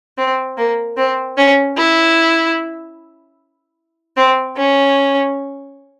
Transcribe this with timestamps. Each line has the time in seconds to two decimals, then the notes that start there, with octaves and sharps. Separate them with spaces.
0.18 C4
0.57 A#3
0.97 C4
1.38 C#4
1.77 E4
4.17 C4
4.57 C#4